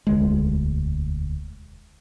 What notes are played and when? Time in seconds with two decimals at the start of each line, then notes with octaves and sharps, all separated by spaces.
0.07 E1 D2 G#3